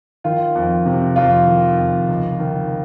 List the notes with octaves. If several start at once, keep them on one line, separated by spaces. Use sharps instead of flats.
D#3 F4
F2
C3
F2 F4
D#3
F2
C#2
D#3